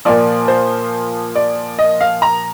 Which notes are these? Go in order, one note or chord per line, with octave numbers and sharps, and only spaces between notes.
A#2 F3 D5
C5
D5
D#5
F5
A#5